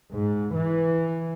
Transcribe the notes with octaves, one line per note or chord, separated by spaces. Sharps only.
G#2
E3